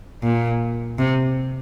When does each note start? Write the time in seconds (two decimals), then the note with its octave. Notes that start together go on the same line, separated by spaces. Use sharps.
0.23 A#2
0.99 C3